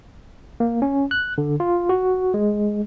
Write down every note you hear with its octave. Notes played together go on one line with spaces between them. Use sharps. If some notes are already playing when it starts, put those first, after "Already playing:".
A#3
C#4
F#6
D3
F4
F#4
G#3